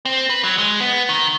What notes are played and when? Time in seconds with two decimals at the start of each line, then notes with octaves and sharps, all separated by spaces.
0.05 C4
0.30 B4
0.44 F#3
0.58 G#3
0.80 B3
1.09 D#3